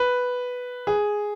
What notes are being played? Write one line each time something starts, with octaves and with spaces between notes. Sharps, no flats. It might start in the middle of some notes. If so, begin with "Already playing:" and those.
Already playing: B4
G#4